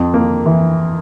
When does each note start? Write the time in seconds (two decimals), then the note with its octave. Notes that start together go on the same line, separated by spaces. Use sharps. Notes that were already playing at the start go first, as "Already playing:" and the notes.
Already playing: F2
0.14 A#3
0.46 E3